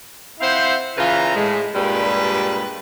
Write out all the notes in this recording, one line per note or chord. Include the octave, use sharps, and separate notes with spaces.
C4 E4 C5 F5 F#5
C#3 E3 F4 B4 A#5
A2 G#3
G2 A#2 G3 G#3 B4